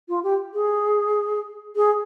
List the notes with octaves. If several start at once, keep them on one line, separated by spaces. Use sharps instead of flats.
F4
G4
G#4
G#4